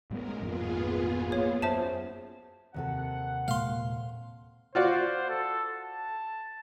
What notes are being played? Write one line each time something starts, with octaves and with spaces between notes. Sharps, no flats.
A2 G3 G#3 B3 A#4
G#1 F2 A#2 B3 F4 G#4
A#3 C#5
F#2 C5 E5 A5
D#2 C3 A4 F#5
A#2 G#3 A#3 F5 C6
F4 F#4 C5 D5
A4
A5